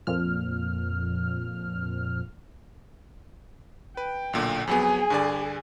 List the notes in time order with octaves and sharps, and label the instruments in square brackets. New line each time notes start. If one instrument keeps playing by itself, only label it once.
[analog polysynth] F2 A#2 F3 F6
[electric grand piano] B4 [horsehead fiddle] G5
[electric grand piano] B1 A#2 D3
[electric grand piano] F2 F#3 B3 [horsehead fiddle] G#4 G#5
[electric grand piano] G2 D3 D5